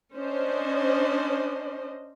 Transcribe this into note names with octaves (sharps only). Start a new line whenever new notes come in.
C#4 D4 C5 D#5